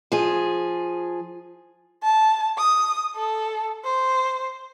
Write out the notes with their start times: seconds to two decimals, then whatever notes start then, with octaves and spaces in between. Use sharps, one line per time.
0.12 F3 G#4
2.03 A5
2.58 D#6
3.16 A4
3.84 C5